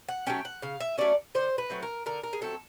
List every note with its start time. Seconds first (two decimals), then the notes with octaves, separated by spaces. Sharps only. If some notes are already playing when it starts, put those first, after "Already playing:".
0.09 F#5
0.27 F#3 A3 C#4 G5
0.45 F#5
0.62 C#3 F5
0.80 E5
0.98 F#3 A3 C#4 D5
1.35 D3 C5
1.58 B4
1.70 F#3 A3 C4
1.82 A#4
2.06 D3 A#4
2.24 A#4
2.33 G#4
2.41 F#3 A3 C4 A4